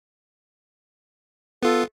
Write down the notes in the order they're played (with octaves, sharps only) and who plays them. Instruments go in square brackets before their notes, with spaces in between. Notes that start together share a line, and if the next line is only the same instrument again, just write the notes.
[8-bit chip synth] B3 F4 [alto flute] A4